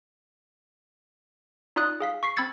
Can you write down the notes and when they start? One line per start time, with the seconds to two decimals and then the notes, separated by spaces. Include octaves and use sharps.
1.76 D#4 F4 D5 D#6 F#6
2.00 G#4 F5 B6
2.23 C#6 B6 C7
2.36 C4 B5 E6 G#6 A6 C#7